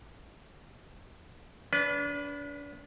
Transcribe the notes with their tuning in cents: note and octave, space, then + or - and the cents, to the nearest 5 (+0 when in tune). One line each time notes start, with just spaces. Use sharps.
D4 -35 B4 +0